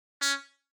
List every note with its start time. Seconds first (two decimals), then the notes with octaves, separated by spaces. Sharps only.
0.22 C#4